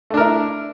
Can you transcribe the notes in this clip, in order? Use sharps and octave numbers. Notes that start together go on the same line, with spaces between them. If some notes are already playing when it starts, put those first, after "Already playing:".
A3 D4 E4 A#4